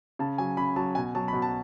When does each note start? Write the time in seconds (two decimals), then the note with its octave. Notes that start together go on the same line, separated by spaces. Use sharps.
0.19 C#3 A5
0.38 F#3 G#5
0.57 C#3 B5
0.76 F#3 A5
0.95 B2 G#5
1.15 F#3 A5
1.28 B2 B5
1.42 A5